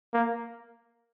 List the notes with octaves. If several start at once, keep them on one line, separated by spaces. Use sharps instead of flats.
A#3